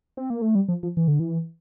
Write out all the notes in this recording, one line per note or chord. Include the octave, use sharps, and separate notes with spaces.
C4
A#3
A3
G3
F3
F3
E3
D3
E3